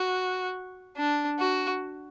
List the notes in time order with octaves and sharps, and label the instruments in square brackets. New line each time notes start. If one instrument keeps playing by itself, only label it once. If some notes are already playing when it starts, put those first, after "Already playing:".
Already playing: [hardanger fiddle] F#4
D4
F#4